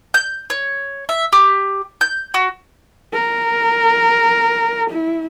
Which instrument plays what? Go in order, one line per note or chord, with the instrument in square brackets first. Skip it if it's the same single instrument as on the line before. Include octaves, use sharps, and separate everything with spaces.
[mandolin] G6
C#5
E5
G4
G6
F#4
[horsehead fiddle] A#4
E4